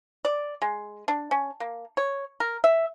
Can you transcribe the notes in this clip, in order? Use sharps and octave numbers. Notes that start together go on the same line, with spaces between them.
D5
G#3
D4
C#4
A#3
C#5
A#4
E5